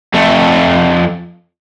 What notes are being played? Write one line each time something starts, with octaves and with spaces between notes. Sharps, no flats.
F2 A3